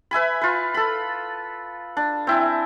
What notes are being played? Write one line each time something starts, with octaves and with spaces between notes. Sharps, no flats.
B4 E5 G#5 B5
F4 B4
A4 B5
D4
C4 E4 G#5